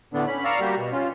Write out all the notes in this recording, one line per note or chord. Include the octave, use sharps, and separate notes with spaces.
A2 D3 A3 B3 D4
C#4 B5
D5 F5 A#5 C#6 E6
G3 A#3 F#4 G4
B2
C#4 F4